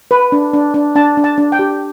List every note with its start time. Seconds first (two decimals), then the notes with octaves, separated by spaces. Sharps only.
0.11 B4
0.32 D4
0.53 D4
0.74 D4
0.95 D4 A5
1.17 D4
1.24 A5
1.38 D4
1.52 G5
1.59 G4